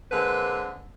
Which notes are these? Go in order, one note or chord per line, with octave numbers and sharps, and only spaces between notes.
D3 G#3 A#3 C4 B4